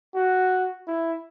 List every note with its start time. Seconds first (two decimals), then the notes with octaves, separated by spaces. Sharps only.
0.15 F#4
0.87 E4